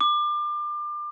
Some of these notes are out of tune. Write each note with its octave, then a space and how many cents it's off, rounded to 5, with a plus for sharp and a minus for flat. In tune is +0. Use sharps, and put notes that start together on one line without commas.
D6 +30